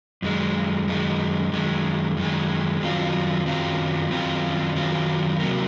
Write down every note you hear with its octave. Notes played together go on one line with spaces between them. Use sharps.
F#2 D#3 G#3
F#2 D#3 G#3
F#2 D#3 G#3
F#2 D#3 G#3
F#2 D#3 F#3 C4 F4
F#2 D#3 F#3 C4 F4
F#2 D#3 F#3 C4 F4
F#2 D#3 F#3 C4 F4
C3 F#3 A#3